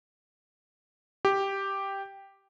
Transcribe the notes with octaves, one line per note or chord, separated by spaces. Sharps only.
G4